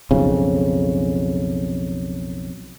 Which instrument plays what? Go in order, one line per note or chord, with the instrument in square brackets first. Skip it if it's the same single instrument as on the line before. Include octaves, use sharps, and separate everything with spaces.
[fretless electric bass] B1 F2 C#3